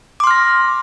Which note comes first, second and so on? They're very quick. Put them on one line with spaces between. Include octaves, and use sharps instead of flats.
D6 C6 F6 A#6